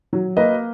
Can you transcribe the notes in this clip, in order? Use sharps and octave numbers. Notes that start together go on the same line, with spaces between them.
F#3
A#3 B4 D#5